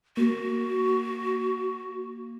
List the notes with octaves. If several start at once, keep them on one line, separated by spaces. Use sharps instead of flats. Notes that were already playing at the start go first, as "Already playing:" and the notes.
A#3 F#4